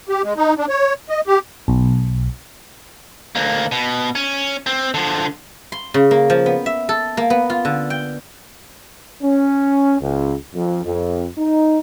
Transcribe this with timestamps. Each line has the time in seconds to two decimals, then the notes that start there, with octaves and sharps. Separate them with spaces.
0.09 G4
0.24 G#3
0.37 D#4
0.57 D4
0.69 C#5
1.09 D#5
1.27 G4
1.68 B1
3.35 D2 A#3
3.72 B2
4.15 C#4
4.66 C4
4.94 D3 F3
5.72 C6
5.94 C#3
6.11 A#3
6.30 F3
6.46 B3
6.66 E5
6.89 A4
7.17 A#3
7.30 B3
7.50 F4
7.65 D3
7.90 G5
9.22 C#4
10.00 C#2
10.54 F2
10.84 F2
11.38 D#4